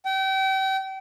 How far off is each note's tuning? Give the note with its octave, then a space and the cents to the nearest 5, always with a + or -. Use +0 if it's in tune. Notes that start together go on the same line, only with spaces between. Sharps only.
G5 -35